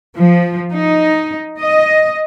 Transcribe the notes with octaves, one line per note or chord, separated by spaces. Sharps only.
F3
D#4
D#5